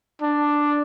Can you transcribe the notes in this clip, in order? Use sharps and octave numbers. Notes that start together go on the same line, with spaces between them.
D4